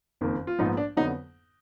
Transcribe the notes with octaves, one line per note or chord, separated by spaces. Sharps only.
F#1 F2 D#3 A#3
F4
A#1 G#2 F3 B3 D#4
D4
F2 D3 F#3 B3 D#4